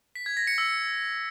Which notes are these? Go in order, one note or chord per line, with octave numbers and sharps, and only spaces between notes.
B6
G#6
A#6
C#7
E6